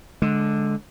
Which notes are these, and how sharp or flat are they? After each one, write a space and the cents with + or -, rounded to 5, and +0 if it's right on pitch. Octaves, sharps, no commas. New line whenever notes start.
D3 +0 G#3 +20